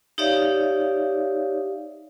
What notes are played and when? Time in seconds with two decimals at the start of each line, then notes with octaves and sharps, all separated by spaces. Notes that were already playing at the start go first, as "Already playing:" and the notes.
0.18 D#4 G4 C#5 D5 E5 F5